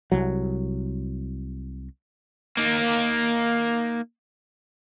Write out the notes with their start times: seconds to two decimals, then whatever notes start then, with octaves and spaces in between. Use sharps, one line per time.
0.12 C2 F#3
2.57 A#3 D#4